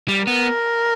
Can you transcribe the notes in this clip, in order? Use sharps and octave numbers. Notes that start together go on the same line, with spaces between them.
G3
B3 A#4